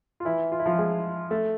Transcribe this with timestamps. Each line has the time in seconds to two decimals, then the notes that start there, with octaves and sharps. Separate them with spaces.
0.20 F4
0.25 E3 E4
0.52 F4
0.59 E4
0.66 F3 F4
0.78 G#3 G#4
1.31 A3 A4